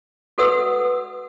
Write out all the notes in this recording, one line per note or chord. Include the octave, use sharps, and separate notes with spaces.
F#4 A4 B4 F#5 D#6 E6